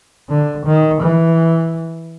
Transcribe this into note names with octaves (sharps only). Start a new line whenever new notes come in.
D3
D#3
E3